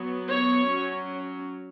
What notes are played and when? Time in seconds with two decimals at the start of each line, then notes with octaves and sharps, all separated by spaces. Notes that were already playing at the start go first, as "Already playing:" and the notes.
Already playing: F#3 B3
0.28 C#5
0.67 F#3 C#4